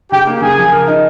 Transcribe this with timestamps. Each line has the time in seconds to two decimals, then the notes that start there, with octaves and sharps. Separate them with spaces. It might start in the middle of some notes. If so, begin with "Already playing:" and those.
0.12 C#3 G4 G5
0.27 A#3
0.42 C#3 G#4 G#5
0.58 F3
0.72 A#4
0.87 D#4